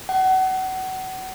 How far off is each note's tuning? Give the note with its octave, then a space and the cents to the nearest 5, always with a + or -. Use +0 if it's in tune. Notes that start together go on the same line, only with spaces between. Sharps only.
F#5 +30